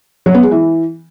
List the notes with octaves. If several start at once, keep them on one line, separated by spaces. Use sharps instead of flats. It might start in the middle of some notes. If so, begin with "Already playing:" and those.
F#3
B3
G#3
E3